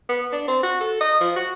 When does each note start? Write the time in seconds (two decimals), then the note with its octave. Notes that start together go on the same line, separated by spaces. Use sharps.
0.09 B3
0.32 D4
0.48 C4
0.63 F#4
0.80 A4
1.01 D#5
1.20 F3
1.36 F#4